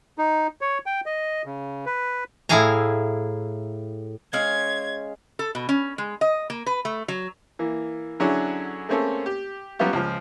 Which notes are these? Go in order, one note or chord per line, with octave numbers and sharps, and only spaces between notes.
D#4
C#5
G5
D#5
C#3
B4
A2 E4 G#4 F5 G#5 A#5
G#3 C#4 F5 G#6
A4
B2
C#4
G#3
D#5
A#3
B4
A3
F#3
E3 A#3
D3 F#3 C#4 D4 E4 G#4
A3 A#3 C4 C#4 G#4 A4
G4
F#3 G3 B3 C#4 F4 G4
C#2 F3